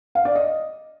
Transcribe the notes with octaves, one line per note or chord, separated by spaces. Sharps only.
F5
D5
D#5